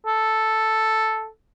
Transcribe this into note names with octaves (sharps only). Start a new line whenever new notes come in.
A4